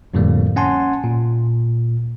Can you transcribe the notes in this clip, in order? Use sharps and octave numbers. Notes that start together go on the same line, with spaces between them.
F2 A2 D3 F3 G3 A#3
C#4 F#5 G#5 A5 C6
A#2